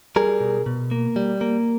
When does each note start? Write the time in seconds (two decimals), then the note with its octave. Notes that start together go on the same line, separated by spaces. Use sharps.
0.16 G3 G#4 A#4
0.41 B2
0.66 B2
0.91 A#3
1.16 G3
1.41 A#3